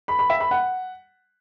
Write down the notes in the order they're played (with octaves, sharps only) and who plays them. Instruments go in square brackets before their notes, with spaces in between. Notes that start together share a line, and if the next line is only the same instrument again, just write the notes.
[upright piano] B5
B5
E5
B5
F#5